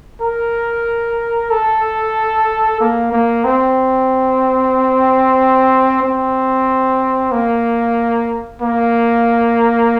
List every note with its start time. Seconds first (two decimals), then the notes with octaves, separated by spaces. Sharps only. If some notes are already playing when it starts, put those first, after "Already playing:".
0.21 A#4
1.50 A4
2.80 A#3
3.13 A#3
3.45 C4
6.03 C4
7.32 A#3
8.61 A#3